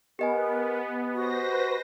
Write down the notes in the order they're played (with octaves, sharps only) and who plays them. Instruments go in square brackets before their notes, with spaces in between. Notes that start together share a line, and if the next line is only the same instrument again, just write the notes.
[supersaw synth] B3 [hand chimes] G4 D#5 G#5 [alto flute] A#4
[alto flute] F#4 [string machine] B4 C5 A#6